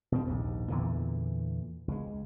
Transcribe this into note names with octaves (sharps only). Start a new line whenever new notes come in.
B2 C4
A#1 D#2 G#2
E2 A#2 D3 E3
C#2 G#3